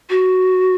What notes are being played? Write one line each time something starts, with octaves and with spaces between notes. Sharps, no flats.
F#4